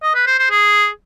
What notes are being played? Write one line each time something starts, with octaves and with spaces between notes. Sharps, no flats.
D#5
B4
C5
C5
G#4